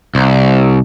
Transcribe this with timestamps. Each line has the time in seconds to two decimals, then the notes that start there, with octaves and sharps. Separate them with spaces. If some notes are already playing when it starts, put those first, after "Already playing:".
0.15 C2